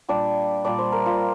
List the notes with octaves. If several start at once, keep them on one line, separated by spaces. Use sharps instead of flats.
A#2 G3 D4 D5
A#2 G3 D4 D5
C5
A#4
F4